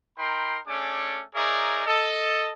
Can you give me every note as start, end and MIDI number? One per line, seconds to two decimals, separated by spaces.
0.18 0.59 63
0.18 0.59 70
0.18 0.59 79
0.18 0.59 83
0.18 0.59 84
0.67 1.23 57
0.67 1.23 61
0.67 1.23 62
0.67 1.23 68
0.67 1.23 69
0.67 1.23 86
1.35 1.85 63
1.35 1.85 68
1.35 1.85 70
1.35 1.85 73
1.35 1.85 74
1.35 1.85 76
1.86 2.52 69
1.86 2.52 75